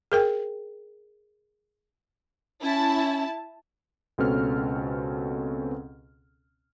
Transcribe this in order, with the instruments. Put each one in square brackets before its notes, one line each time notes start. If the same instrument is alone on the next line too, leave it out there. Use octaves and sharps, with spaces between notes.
[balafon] G#4 A#4 G5
[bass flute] C#4 [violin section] E4 A5
[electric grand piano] C#2 B2 C4 C#4 A4 F6